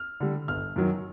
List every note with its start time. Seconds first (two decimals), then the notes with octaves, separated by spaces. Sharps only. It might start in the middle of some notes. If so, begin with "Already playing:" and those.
Already playing: F6
0.20 D3 G3
0.48 G1 F6
0.76 F#2 D#3 F#3